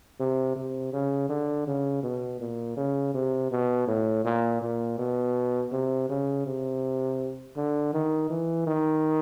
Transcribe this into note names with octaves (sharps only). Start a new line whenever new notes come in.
C3
C3
C#3
D3
C#3
B2
A#2
C#3
C3
B2
A2
A#2
A#2
B2
C3
C#3
C3
D3
D#3
E3
D#3